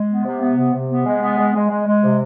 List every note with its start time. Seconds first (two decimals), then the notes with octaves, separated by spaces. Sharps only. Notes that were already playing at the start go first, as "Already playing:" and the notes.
Already playing: G#3
0.09 B3
0.25 C3
0.42 B3
0.57 C3
0.74 C3
0.89 B3
1.05 G#3
1.21 B3
1.38 G#3
1.55 G#3
1.70 G#3
1.86 G#3
2.02 C3